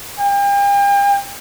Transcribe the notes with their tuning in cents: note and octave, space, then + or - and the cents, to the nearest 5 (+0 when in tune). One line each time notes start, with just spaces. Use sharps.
G5 +40